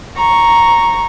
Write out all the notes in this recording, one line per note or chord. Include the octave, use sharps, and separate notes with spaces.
A#5 C#6